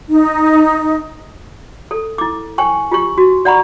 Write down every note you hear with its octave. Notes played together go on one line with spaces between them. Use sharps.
D#4
A4
E4 D6
C5 G5 G#5 C#6
F4 G4 C#6
F#4
D5 F#5 A#5 B5 C#6